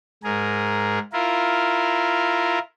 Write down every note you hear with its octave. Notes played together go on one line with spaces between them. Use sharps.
G#2 G#4 A#4
E4 F4 A#4